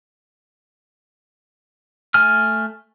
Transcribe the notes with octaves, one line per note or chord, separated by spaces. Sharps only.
A3 G#5 F6